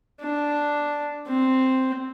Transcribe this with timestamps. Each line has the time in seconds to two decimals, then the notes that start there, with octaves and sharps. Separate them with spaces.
0.21 D4
1.27 C4